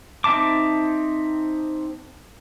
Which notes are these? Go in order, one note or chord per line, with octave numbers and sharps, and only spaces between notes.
C4 D#4 E5 A5 D6